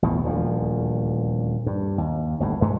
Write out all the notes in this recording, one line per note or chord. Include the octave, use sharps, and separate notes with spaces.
A1 E2 B2 D#3
D#1 D2 F3
G2
D#2
G1 D2 A2
G2 G#3 A3